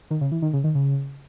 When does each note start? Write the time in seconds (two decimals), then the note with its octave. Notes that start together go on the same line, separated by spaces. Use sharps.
0.10 D#3
0.21 C#3
0.32 E3
0.42 D#3
0.53 C#3
0.64 D#3
0.75 C#3